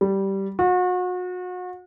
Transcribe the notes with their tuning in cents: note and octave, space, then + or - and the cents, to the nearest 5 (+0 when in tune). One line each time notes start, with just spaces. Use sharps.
G3 -10
F#4 -35